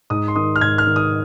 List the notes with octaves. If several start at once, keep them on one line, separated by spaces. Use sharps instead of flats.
G#2 D#6
C6
D#3 D#6
F6
G#2 G#6
F6
D#3
D#6